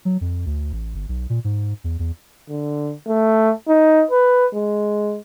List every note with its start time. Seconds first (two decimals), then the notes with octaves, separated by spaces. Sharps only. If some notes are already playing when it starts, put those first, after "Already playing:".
0.05 F#3
0.21 F2
0.46 D2
0.73 A1
0.95 G1
1.09 B1
1.30 A#2
1.44 G#2
1.84 E2
1.99 E2
2.49 D3
3.07 A3
3.68 D#4
4.11 B4
4.54 G#3